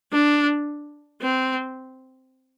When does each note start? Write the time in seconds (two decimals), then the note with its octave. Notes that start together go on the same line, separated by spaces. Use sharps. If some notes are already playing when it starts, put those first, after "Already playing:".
0.13 D4
1.21 C4